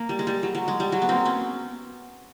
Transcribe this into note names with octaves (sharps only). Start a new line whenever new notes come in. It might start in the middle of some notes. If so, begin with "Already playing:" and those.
Already playing: A#3
G3
G#3
G3
F#3
F#3
G#3
G3
F#3
B3
A#3 C4
B3 C#4